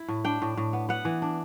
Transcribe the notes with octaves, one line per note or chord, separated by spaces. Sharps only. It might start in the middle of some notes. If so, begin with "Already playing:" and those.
Already playing: E4
A2
D4 G5
A2
A2
B3
B3 F#5
E3
D4